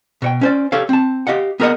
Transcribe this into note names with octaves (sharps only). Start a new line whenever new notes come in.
B2 C#5 G5
C#4 C5 D5
G4 A4 C#5 F5
C4 A5
G4 D#5 F5 F#5
B3 G#4 A#4 C#5 D#5 F#5